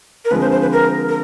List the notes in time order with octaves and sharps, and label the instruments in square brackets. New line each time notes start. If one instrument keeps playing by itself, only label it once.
[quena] A#4
[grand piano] D3 F3 G#3 C4 [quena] B4
[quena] C5
C5
B4
A#4
A#4